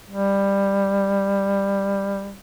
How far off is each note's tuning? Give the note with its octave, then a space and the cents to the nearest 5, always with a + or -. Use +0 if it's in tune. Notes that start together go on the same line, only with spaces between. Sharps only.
G3 +15